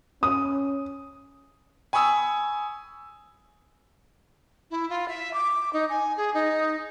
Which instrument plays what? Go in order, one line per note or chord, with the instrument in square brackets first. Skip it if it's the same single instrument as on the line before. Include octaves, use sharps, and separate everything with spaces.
[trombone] C#4 [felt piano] D#6
[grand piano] G#5 B5 C#6 D#6 E6
[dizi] E4
F4
E5
D6
D#4
G#5
G#4
D#4